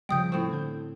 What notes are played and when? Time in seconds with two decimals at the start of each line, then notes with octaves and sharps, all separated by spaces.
0.09 C#3 F3 G3 G5 D#6 G6
0.32 A2 C4 C#6
0.51 D3 G6